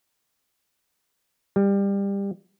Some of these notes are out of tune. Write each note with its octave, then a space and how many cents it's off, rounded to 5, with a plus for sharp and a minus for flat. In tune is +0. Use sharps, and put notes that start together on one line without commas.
G3 +20